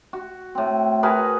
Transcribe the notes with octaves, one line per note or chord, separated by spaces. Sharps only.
F#4
A2 C4
F#4 G#4 A#4 B4